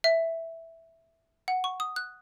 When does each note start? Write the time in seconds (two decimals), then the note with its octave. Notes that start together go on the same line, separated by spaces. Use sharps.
0.04 E5
1.48 F#5
1.64 C#6
1.80 D#6
1.96 F#6